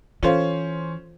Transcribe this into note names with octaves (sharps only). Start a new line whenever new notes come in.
E3 C#4 F4 A4 C5 F5